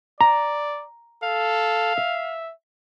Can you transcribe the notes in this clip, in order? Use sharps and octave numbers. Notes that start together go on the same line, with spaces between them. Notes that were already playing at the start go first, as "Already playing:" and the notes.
D5 A#5
A4 F5
E5